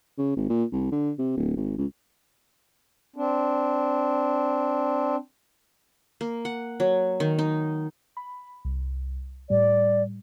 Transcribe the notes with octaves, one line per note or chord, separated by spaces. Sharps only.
C#3
G#1
A#2
C2
D3
C3
D1
G#1
C#2
C4 D4
A#3
F#5
F#3
D#3
D#4
B5
C2
A2 G3 D5